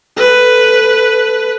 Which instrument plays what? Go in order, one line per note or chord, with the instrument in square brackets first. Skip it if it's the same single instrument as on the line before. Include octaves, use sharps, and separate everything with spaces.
[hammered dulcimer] A4 [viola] B4